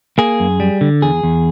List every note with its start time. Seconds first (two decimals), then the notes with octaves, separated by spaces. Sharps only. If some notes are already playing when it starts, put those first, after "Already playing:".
0.18 A#3 G#4
0.40 F#2
0.60 G3
0.81 D3
1.02 E2 G#4
1.24 E2